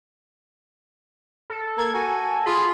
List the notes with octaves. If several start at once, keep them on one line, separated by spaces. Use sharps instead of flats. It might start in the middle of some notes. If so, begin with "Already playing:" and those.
A4
A#3 G#6
F#4 G#5
F4 G#4 B5